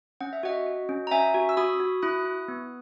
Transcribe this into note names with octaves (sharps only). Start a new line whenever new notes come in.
C#4 F#5
E5
F#4 D#5 F#5
F#4
C#4
A#5
C#4 E5 G#5
F#4
E6
F#4 B5 D#6
F#4
E4 D#6 F#6
E4
B3